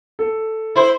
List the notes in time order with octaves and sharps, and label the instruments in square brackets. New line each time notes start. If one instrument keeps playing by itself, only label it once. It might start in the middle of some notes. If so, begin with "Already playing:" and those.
[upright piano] A4
[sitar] E4 C5